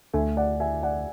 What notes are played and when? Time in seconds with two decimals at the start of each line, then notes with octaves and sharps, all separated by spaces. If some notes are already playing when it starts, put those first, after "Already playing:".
0.13 D2 D3 A3 E5 G#5
0.37 D5 F#5
0.60 E5 G#5
0.83 D5 F#5